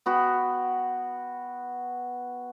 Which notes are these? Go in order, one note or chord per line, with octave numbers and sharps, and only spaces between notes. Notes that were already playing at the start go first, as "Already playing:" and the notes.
B3 F#4 G5